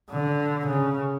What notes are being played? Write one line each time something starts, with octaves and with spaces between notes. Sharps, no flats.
D3
C#3